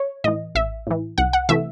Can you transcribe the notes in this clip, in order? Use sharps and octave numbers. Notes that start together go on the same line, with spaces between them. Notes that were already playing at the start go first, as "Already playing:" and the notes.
Already playing: C#5
A2 E3 D#5
A1 E5
A2 E3
C2 F#5
F#5
C3 E3 A3 E5